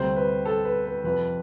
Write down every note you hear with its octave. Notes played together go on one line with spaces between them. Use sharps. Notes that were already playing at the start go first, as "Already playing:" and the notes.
Already playing: D2 C3 G3 C5
B4
A4
B4
B4
F2 C3 F3 B4